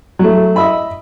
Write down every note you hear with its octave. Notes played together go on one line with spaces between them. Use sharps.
F#3 A3
D#5 E5 B5